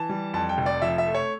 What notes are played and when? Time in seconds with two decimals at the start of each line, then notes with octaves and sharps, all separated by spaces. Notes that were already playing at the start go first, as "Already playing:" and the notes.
Already playing: E3 A5
0.09 G3
0.34 F2 A5
0.49 G5
0.58 F1
0.66 D5
0.82 F3 E5
0.98 E5
1.06 A3
1.15 C#5